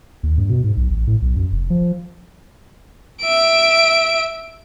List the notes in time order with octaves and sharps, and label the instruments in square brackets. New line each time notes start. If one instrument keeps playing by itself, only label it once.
[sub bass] D#2
G2
B2
G#2
B1
A1
A2
B1
F#2
F1
F3
[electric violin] E5 D7